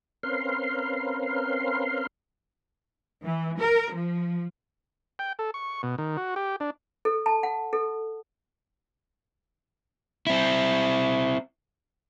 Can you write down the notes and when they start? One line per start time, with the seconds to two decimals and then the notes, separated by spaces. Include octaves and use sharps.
0.23 C4 C#4 A#4 B4 F5 C6
3.24 E3
3.60 A#4
3.94 F3
5.19 G5
5.39 A4
5.54 C#6
5.83 B2
5.98 D#3
6.17 F#4
6.36 G4
6.60 D4
7.05 A4
7.26 A5
7.43 F#5
7.73 A4
10.27 C4 E4